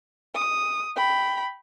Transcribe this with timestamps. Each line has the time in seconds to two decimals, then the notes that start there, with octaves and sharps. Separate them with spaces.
0.35 D#6
0.97 G5 B5